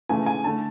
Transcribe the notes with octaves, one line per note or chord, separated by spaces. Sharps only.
C#3 E3 A3 G#5
G#5
D3 A3 A5